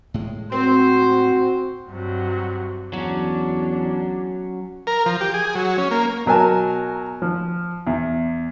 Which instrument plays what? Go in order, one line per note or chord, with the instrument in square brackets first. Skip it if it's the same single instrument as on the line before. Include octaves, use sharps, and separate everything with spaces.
[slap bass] A2 G#3
[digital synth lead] C4 [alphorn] F#4 [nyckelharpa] C5
[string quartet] G2 C3 F#3
[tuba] E2 [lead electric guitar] F#3 C#4 [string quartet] D4
[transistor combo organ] A#4
F3
G4
G#4
F#3
C#4
A#3
[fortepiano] B2 F#3 A#4 G#5 A5
F3
E2